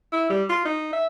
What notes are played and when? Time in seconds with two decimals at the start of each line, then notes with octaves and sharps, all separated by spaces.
0.13 E4
0.30 G3
0.50 F4
0.65 D#4
0.93 E5